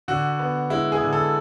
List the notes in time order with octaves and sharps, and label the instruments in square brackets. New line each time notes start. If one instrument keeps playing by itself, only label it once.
[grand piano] D3 F#4
B3
G#3 E4
G#4
D3
A4